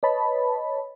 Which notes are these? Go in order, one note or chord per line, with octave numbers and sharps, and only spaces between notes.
B4 C#5 D#5 A5 B5